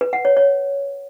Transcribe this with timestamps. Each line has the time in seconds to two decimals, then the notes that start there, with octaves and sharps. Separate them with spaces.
0.01 B4
0.13 F#5
0.25 C#5
0.37 C#5